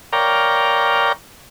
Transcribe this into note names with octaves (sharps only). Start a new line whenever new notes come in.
A#4 C#5 D5 F5 G5 A#5